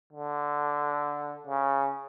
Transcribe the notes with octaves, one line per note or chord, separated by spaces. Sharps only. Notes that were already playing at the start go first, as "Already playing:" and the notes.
D3
C#3